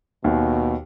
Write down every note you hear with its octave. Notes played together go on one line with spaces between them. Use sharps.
D#2 B2